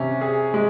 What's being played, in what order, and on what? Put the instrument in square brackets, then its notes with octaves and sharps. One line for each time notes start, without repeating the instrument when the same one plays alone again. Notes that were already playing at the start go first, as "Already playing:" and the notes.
Already playing: [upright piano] C3 C#4
G#4
G#3